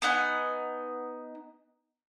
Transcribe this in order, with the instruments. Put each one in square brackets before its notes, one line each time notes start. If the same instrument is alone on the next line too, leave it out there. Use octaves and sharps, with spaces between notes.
[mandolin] B3 D#4 F#5 G#5